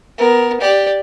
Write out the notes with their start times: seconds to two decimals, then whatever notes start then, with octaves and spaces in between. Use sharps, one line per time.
0.18 B3 A#4
0.61 G4 D5